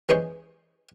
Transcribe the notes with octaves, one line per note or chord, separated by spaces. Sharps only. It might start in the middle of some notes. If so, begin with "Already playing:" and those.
E3 G#3 C#4 G#4 C5